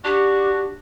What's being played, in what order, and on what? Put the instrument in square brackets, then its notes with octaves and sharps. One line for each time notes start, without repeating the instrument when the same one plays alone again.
[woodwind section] D4 F#4 [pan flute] G4